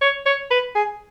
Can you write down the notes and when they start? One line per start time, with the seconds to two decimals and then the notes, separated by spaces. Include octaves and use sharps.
0.02 C#5
0.26 C#5
0.51 B4
0.75 G#4